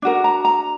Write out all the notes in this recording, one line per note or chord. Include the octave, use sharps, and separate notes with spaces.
D4 F#4 A#4
A#5
A#5